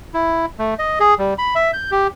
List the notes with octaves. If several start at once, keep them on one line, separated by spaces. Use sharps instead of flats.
E4
A3
D#5
G#4
G3
B5
E5
G6
G4